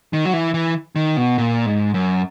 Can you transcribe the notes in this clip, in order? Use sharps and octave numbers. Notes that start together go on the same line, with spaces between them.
D#3
F#3
E3
E3
D#3
B2
A#2
G#2
F#2